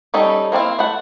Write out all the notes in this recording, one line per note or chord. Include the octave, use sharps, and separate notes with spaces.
G3 C#4 D#4 A4
A#3 C4 E4 F5
A3 F#5